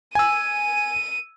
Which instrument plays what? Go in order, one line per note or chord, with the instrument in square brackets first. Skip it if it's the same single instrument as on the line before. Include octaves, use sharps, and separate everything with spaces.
[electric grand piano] G#5 E6 [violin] D#7